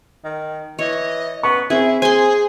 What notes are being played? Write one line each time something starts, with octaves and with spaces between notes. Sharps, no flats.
D#3
E3 C#5 D#5
B3 C#6
C4 E4 G#4 E5
G#4 C5 G#5 C6